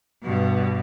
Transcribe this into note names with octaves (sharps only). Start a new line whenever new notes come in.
G2 B2